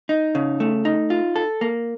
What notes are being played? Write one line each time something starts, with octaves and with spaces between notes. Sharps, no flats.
D#4
C#3
A3
D#4
F4
A4
A#3